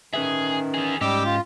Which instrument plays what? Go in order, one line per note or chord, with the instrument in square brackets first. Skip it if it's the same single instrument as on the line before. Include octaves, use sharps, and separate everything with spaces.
[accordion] D#3 [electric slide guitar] C#4 B4 E5 [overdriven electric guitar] G#4
[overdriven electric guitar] E3 G#4
[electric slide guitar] G#2 C#4 D#5 [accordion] G3 D6 E6 [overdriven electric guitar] G4
[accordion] F4